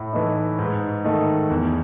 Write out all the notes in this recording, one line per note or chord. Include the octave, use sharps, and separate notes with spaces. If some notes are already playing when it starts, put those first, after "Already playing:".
Already playing: A2
E3 A3 D#4
G#2
D#3 A3 D#4
E2